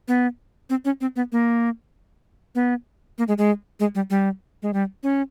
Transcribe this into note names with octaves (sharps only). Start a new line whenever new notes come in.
B3
C4
C#4
C4
B3
A#3
B3
A#3
G#3
G#3
G#3
G3
G3
G#3
G3
C#4